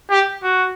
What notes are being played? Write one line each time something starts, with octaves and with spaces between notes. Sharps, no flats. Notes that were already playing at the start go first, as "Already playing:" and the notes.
G4
F#4